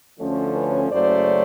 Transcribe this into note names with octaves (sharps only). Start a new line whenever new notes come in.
D2 D3 F3 A3 C#4
B4 C#5
F#1 F#2 C#3 F#3 A3 C5 D5